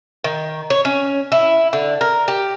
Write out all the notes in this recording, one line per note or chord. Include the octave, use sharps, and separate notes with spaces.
D#3
C#5
C#4
E4
D3
A#4
G4